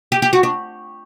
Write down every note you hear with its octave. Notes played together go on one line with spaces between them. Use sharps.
G4
G4
F#4
D4